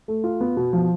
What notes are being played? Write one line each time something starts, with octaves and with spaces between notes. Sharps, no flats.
A3
F4
B3
B2
F3